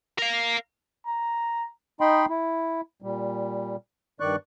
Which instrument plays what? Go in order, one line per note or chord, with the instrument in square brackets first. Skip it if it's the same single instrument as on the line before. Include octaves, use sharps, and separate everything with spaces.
[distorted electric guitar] A#4 F5
[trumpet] A#5
[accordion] D#4 D#5 G5 B5 C6
E4
A#2 G3
G2 D#3 D5 C#6 F#6